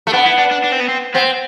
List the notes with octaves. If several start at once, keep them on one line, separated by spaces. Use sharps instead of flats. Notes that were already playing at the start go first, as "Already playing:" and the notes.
A3
B3 D4
E4
D4
D4
D4
C4
B3
C4
B3 C4